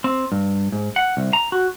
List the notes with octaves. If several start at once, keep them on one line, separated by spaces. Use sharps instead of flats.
C4
G2
G#2
F#5
C2
A#5
F#4